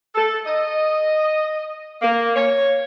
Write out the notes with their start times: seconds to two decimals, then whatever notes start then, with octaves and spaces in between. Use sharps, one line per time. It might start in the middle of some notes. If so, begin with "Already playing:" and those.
0.15 A4
0.46 D#5
2.02 A#3
2.36 C#5